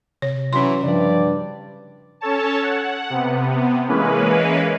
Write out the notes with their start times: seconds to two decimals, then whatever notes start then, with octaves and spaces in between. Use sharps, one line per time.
0.22 C3 C#5
0.53 E3 F#3 C#4 C6
0.84 G2 C#3 F3 D5
2.21 C#4 A4 C#5 A5
2.62 F#5
3.10 C3 B3
3.88 E3 G#3 A#3 C#4 B4